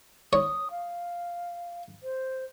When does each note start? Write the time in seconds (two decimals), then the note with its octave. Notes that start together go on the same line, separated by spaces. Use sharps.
0.33 C#5 D#6
0.71 F5
2.03 C5